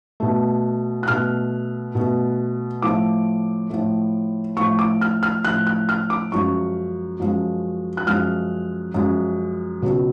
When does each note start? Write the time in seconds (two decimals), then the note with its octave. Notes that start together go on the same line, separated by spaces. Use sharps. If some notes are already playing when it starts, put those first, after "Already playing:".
0.20 B2 A3
1.03 F#6
1.08 B2 A3 F6
1.95 B2 A3
2.82 A2 F3 A3 D6
3.70 A2 F3 A3
4.57 A2 F3 A3 C#6
4.79 D6
5.01 F6
5.23 F6
5.45 A2 F3 A3 F#6
5.67 F#6
5.89 F6
6.10 D6
6.32 F#2 F3 G#3 C#6
7.20 F#2 F3 G#3
7.97 F#6
8.07 F#2 F3 G#3 F6
8.94 F#2 F3 G#3
9.82 C#2 B2 F#3